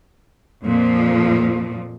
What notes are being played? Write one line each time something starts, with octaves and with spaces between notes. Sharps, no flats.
F2 A#2 F3